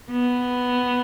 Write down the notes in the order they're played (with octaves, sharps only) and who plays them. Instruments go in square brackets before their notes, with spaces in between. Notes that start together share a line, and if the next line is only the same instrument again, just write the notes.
[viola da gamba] B3